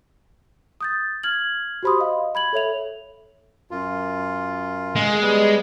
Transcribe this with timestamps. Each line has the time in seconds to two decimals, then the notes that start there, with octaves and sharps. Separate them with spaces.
0.81 D#6 G6 A6
1.23 F6 G#6 F#7
1.83 F#4 G4 C5 B5 C6 D#6
1.99 D#5 F5
2.35 B5 G#6 F#7
2.53 A4 C#5 E5 F7
3.71 F#2 F4
4.95 G#3
5.21 G3 B3